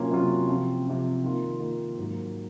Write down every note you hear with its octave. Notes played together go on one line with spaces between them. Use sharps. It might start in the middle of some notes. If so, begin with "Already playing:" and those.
Already playing: C3 F#3 A#3 C#4 F4
C3 F#3 A#3 C#4 F4
C3 F3 C4
C3 F3 C4
D#3 A#3 F4
D#3 A#3 F4
G#2 F#3 A#3